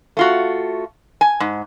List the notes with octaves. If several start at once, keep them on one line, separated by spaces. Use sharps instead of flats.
A3 F4 F#4
G#5
G#2